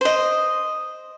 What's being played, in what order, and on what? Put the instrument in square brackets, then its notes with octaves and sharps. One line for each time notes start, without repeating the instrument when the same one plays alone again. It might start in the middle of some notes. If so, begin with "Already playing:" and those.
[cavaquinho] C5 D#5